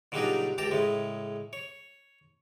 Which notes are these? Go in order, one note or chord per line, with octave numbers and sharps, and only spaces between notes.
A#2 C#3 F#3 G3 D4 D#4
C#2 G4 G5 A5 A#5
A2 C#3 G#3
C#5